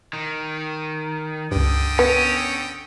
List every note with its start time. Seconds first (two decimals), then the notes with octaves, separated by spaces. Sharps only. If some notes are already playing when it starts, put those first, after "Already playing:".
0.13 D#3
1.52 C#2 G2 D3 G5 D#6
1.99 B3 C#4